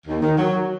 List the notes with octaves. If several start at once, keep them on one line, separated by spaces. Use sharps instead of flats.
D#2
D#3
F#3